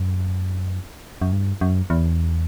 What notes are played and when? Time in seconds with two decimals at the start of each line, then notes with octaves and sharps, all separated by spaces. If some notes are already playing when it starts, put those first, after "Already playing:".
Already playing: F#2
1.22 F#2
1.32 G2
1.61 F#2
1.90 E2